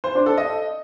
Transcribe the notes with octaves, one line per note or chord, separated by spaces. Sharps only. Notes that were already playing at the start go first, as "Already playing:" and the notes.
C5
D4
A4
D#5